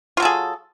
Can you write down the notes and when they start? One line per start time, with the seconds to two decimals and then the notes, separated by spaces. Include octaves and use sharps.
0.17 F4
0.20 F#3
0.22 A4
0.25 G#4